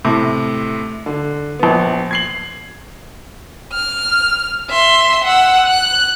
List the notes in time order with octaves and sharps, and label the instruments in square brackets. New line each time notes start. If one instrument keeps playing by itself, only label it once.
[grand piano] A2 C3
D3
A#1 B3
G#6 C7 F#7
[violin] F6
E5 C6
F#5 E6
F#6